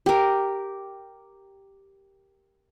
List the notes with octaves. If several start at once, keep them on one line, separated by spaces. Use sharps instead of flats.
G4 A#4